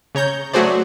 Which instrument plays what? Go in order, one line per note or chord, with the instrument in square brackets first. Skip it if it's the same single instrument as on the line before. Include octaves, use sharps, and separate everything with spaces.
[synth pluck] C#3 C#5 A#5 G6
F#3 A3 F#4 G#4 C5 D5